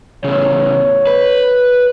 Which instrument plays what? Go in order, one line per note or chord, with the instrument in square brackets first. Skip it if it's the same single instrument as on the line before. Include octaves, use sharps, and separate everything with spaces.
[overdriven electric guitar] A2 C#3 [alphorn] C#5
[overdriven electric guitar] B4